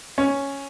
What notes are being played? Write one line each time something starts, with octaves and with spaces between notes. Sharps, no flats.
C#4